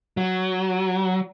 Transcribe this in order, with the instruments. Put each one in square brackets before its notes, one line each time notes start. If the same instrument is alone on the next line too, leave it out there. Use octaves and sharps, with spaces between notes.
[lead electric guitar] F#3